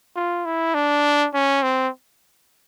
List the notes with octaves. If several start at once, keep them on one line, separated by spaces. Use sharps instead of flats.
F4
E4
D4
C#4
C4